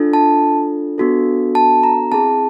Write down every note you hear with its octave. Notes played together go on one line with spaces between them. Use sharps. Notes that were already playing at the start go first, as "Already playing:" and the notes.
Already playing: D4 F4 A4
A5
B3 D4 F#4 A4
A5
A#5
C4 E4 G#4 A5